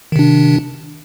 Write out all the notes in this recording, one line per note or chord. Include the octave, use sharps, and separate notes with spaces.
C3 D#3 D4